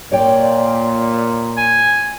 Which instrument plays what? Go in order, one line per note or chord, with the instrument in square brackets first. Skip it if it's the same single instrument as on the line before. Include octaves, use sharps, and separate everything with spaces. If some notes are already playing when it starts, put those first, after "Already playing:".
[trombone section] A#2 [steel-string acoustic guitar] C#5 D5 G5
[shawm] G#5